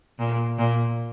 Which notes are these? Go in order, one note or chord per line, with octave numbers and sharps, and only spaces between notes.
A#2
A#2